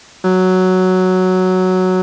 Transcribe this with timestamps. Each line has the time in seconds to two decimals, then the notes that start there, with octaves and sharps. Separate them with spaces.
0.24 F#3